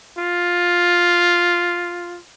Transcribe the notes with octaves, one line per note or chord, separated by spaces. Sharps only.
F4